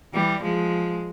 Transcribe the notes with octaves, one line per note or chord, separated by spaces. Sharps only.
E3 G3
F3 G#3